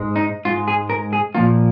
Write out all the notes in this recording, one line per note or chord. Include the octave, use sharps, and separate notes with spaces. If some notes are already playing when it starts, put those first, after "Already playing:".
Already playing: G#2 G#3
D#4
G#2 G#3 F4
G#4
A#4
G#4
A#2 F3 A#3 F4